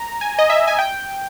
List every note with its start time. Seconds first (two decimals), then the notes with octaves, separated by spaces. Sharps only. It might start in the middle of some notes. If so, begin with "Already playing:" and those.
Already playing: A#5
0.21 G#5
0.38 D#5
0.50 E5
0.67 G#5
0.78 G5